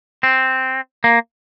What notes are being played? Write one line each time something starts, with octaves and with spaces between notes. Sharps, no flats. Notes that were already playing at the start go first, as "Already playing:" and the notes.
C4
A#3